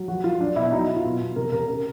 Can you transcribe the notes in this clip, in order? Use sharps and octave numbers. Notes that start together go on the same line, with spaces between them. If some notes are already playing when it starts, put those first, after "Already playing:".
Already playing: F#3
F3 F#4
F3 F4
F#3 D4
B2 E4
F#3 D#4
F#3 E4
F4
B2
B2
C3 A#4
C3 A#4
C#3 A#4